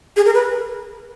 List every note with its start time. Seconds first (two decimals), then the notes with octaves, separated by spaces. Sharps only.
0.16 G#4
0.26 A#4
0.34 B4